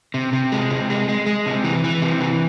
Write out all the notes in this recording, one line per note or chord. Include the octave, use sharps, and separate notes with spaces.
C3
C3
G#3
C3
G#3
G#3
G#3
C3
E3
E3
C3
E3